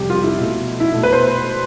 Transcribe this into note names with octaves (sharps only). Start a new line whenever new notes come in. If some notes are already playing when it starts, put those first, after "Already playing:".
Already playing: F2 C3 G3 G4
F4
E4
B2 A3
E4
B2 A3
B4
C5